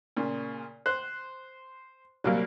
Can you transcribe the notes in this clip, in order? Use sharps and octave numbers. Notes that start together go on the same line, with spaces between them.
A#2 C#3
C5 F#6
C2 F#3 G3 A#3